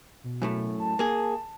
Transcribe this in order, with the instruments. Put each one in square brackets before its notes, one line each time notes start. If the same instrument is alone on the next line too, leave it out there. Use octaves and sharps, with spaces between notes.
[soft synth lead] B2
[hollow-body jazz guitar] F#2 A2 A3
[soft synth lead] A5
[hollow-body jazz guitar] A#3 G#4